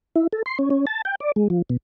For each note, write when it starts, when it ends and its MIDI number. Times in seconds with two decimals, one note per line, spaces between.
0.16 0.27 64
0.33 0.42 69
0.46 0.58 84
0.59 0.69 61
0.70 0.85 61
0.87 1.02 81
1.05 1.15 79
1.20 1.32 74
1.36 1.48 56
1.50 1.62 53
1.70 1.77 47